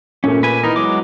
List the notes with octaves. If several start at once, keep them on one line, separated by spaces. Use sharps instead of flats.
A#2 A3 C#4
B4 G#5
E3 B3 D#4 A#4
F#3 G#3 D6